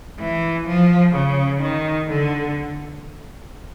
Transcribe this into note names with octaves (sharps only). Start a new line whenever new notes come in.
E3
F3
C#3
D#3
D3